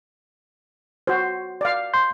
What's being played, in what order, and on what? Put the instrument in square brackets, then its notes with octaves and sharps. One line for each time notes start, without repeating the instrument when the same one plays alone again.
[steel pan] F#4 C5
D5 F5
[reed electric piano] C6 G6